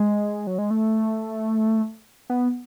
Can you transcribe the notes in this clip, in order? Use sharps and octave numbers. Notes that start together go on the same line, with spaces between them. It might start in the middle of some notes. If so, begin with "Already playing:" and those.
Already playing: G#3
F#3
G#3
A3
B3